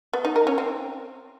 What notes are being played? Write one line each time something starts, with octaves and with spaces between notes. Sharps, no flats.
B3
D#4
A#4
C#4
C4